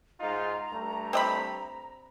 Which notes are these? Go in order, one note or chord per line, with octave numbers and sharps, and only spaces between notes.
G#2 D#4 F4 A#5
G2 A3
C4 D#5 B5